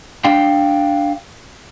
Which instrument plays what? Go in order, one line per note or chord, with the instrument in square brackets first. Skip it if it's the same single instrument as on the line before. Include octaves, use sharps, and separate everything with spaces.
[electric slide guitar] D4 F5 G5